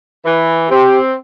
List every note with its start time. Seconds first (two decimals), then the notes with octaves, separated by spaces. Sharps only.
0.24 E3
0.70 C4 G4